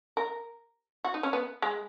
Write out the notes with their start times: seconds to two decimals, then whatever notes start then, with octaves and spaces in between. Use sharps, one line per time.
0.17 A#4
1.04 F#4
1.14 D#4
1.23 C#4
1.33 B3
1.62 G#3